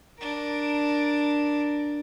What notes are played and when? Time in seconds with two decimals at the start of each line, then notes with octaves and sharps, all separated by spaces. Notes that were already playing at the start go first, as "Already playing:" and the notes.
0.18 D4 A#4